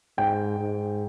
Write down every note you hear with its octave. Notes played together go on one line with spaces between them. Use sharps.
G#2 G5
G#2